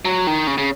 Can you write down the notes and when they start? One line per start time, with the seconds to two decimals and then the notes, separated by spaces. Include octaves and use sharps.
0.05 F#3
0.27 D#3
0.47 C#3
0.58 C#3